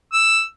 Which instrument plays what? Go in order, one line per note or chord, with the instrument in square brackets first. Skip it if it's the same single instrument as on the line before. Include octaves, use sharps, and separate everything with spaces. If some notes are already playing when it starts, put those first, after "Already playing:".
[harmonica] E6